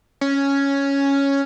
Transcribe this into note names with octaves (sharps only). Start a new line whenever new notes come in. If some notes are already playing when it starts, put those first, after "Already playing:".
C#4